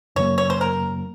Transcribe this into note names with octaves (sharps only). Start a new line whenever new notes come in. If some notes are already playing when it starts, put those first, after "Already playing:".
F#2 C#3 F#3 A#3 C#5
C#5
C5
A#4